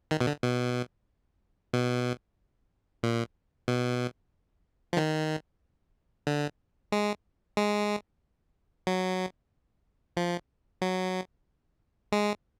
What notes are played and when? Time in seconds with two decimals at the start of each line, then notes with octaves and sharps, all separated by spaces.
0.11 D#3
0.21 B2
0.27 D3
0.43 B2
1.73 B2
3.03 A#2
3.68 B2
4.93 F3
4.97 D#3
6.27 D3
6.92 G#3
7.57 G#3
8.87 F#3
10.17 F3
10.82 F#3
12.12 G#3